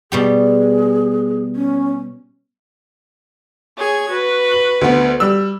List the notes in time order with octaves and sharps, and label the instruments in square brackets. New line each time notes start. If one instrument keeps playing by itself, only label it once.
[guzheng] B2 G3 G4 [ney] G#4
[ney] C#4
[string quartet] G#4 C#5 G#6
F#4 B4
[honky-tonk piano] F#7
D2 B3
G3 E6